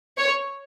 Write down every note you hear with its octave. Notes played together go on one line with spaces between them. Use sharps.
C#5